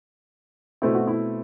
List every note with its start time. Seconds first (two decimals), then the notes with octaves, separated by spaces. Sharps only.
0.82 B2 A3 C4 E4
0.95 F#4
1.07 E4